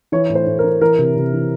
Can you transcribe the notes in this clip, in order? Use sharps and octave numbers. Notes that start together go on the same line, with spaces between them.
E3 C#5
A2
C5
A2
A#4
E3
E3 A#4
C3
C3
E3